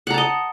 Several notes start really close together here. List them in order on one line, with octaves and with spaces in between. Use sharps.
F#5 A#5 A5 D#5